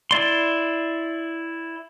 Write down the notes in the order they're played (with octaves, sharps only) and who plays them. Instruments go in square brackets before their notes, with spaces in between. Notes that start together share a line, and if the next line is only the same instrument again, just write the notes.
[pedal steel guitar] E4 D5 C6